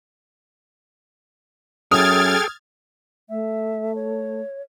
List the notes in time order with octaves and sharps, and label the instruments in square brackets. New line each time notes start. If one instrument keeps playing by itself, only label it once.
[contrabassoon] F#2 [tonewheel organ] G#4 A4 G5 [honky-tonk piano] D#6 [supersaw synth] F6 G#6 A6
[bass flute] A3 [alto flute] E5
[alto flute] C#5